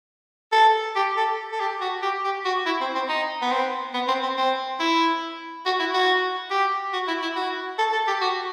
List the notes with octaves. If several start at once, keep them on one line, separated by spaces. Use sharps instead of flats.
A4
G4
A4
A4
G4
F#4
G4
G4
F#4
E4
C4
C4
D#4
B3
C4
B3
C4
C4
C4
E4
F#4
E4
F#4
G4
F#4
E4
E4
F#4
A4
A4
G4
F#4